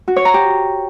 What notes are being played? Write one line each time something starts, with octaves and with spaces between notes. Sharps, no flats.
F#4
C#5
A#5
G4